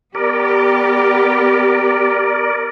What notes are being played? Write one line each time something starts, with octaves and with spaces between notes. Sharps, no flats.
B3 G4 A#4 D5